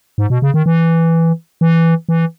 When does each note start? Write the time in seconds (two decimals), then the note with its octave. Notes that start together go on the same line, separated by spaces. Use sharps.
0.18 G#2
0.30 B2
0.42 C#3
0.54 D#3
0.66 E3
1.61 E3
2.09 E3